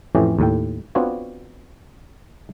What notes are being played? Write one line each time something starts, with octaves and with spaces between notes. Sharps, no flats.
F2 A2 E3 C#4 G4
D#2 A2 G5
B3 C4 D4 F4 F#4 C#5